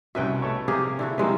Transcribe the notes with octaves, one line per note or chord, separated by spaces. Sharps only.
C2 B2 C#4 B4 E5 G5
A3 A4 C#5
C3 A#3 G4 G#4
D3 E4 F#4
A2 C3 G3 G#3 A#3 B4